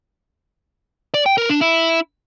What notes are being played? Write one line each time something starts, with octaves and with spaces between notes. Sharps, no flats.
D5
G5
A#4
D4
E4